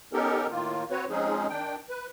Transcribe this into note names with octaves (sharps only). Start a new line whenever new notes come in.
B3 C#4 D#4 G4 A4 A#4
A2 D#3 A#3 F4
C4 F#4 B4 C#5
F3 G#3 C4 C#4 D#4 G#4
D#3 D4 G5
B4